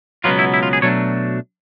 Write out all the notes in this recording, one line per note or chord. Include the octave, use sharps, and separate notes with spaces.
C#2 B2 F#3 B3 F4
E4
E4
F4
G#4
B2 F#3 A3 D4 C#5